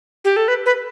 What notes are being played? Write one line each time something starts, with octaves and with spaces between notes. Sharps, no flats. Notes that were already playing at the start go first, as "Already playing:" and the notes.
G4
A4
B4
B4